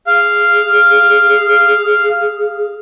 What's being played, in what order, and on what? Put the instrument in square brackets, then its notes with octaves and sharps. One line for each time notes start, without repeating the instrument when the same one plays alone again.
[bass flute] G#4 [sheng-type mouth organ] F5